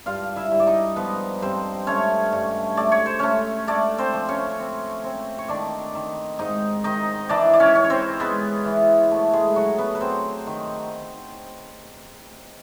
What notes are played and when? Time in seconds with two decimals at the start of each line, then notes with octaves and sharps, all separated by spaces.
0.06 G2 F4 F5
0.36 E4 E5
0.51 G2
0.60 D5
0.67 D#4 D#5
0.96 F3 B3 B4
1.42 G2 C4 C5
1.87 A3 C#4 C#5
2.33 G2
2.77 A3 D5
2.92 C#5
3.06 C5
3.19 A3 C#4 C#5
3.68 A3 D4 D5
3.98 C4 C5
4.13 F3
4.29 C#4 C#5
4.59 C4
5.04 C4
5.39 C#5
5.49 D#3 D4 D5
5.95 D#3
6.39 G#2 D#4 D#5
6.84 D#3 D#4 D#5
7.29 E3 D4 D5
7.54 D5
7.60 C#4 C#5
7.75 C#4
7.84 C#5
7.90 C4 C5
8.20 G#3 B3 B4
8.65 E3
9.11 A3
9.33 G#3 G#4
9.56 F#3 F#4
9.78 B3 B4
9.95 B4
10.01 F#3 C4 C5
10.47 D#3